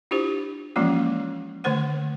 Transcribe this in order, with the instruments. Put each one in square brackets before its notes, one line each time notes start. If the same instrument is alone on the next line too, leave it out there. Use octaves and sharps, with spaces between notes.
[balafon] D4 E4 F4 G4 C5
E3 F3 G#3 A#3 C#4 F4
D3 D#3 A3 C5 F#5